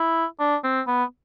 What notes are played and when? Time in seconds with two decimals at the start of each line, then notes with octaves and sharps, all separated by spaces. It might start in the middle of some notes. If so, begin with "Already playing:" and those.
Already playing: E4
0.39 D4
0.64 C4
0.87 B3